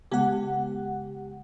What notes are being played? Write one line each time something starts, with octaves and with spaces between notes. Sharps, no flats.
C#3 G#3 B3 G4 F#5